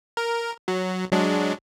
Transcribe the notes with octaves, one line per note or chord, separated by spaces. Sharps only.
A#4
F#3
F#3 G#3 D4